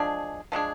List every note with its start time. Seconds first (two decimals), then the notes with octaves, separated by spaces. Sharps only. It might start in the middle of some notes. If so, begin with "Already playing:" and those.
Already playing: F3 G#3 D4 G#4
0.52 F3 G#3 D4 G#4